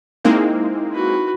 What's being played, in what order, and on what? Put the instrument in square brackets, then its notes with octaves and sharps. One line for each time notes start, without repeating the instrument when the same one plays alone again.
[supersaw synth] G#3 A#3 C4 [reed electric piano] D#4 E4
[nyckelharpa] F#4 B4